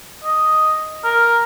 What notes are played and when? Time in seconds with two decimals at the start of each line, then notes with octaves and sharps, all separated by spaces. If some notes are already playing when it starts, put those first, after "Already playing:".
0.24 D#5
1.04 A#4